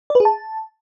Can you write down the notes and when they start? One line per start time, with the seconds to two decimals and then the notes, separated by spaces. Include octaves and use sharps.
0.10 D5
0.15 B4
0.20 G#4
0.25 A5